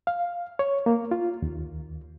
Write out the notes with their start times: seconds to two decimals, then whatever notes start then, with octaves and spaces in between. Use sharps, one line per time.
0.07 F5
0.59 C#5
0.86 A#3
1.11 F4
1.42 D#2